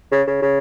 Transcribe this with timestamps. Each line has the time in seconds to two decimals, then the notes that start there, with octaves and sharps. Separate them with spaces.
0.12 C#3
0.28 C#3
0.42 C#3